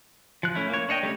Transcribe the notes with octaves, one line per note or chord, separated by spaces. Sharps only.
F3 F#6
A3 C#4 E4
A#3 C#5
D4 C#5 D#5 G5
G3 A3 C#4 C#5